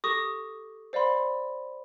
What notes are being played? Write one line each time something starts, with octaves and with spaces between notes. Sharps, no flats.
G4 A4 C#6 D#6 A#6
C5 D5 F5 B5 C6